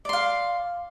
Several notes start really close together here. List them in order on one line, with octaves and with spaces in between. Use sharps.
D5 C6 F5